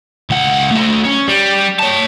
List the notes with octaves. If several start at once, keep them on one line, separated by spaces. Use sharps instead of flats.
C#2 F#5
A3 F#4
C#4
G3
C#5 A5